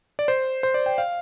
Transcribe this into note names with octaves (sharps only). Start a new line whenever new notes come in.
D5
C5
C5
D5
G5
F5